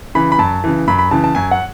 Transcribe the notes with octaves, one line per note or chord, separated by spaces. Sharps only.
C#3 E3 B5
B5
F#2 A5
C#3 E3
F#2 B5
B5
C#3 E3 A5
A5
F#2 G#5
F#5